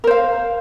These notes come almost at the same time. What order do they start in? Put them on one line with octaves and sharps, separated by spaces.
A#4 C5 F5